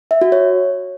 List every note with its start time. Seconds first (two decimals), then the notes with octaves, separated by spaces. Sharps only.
0.11 E5
0.21 F#4
0.32 C#5